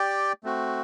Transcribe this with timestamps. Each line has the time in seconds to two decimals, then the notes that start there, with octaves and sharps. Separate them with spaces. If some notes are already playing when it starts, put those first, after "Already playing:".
Already playing: G4 D5 G5
0.44 A3 C4 F#4